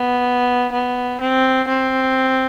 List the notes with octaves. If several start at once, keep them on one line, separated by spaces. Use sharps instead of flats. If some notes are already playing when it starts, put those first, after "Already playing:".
Already playing: B3
B3
C4
C4